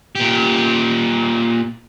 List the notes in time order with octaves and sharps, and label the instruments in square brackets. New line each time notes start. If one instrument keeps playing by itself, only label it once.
[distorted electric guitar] A#2 G4